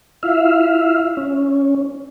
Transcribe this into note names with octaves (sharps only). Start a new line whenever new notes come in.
E4 F4 E5 F5
C#4